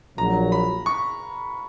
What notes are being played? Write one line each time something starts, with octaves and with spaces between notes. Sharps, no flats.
A#1 A#2 F#3 A#5
B5
C#6